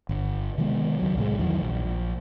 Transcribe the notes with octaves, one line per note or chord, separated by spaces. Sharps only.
G1
C3 D#3 G#3 B3
C#2 F#3
C2 A2 F3 G#3
E2 D#3 E3 F#3
A#1